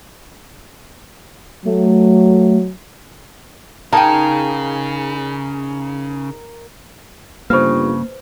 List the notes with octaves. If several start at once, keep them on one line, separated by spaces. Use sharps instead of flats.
F#3 A3
C#3 D#4 G#4 A#4 F5 G5 A5
G1 G2 C#3 A#3 B4 C5